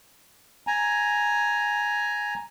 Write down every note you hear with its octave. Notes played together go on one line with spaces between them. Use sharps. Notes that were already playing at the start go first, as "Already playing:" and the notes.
G#5 A#5